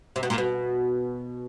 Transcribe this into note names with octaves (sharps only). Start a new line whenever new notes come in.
C3
B2
A#2
B2